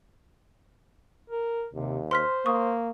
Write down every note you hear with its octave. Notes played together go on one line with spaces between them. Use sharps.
A#4
D#2 C3
C5 C6 F6 B6
A#3 C#6 D#6